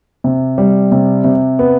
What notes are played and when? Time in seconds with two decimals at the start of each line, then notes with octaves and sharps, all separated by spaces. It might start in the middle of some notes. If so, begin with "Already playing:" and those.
0.24 C3
0.58 G3
0.92 C3
1.24 C3
1.59 B3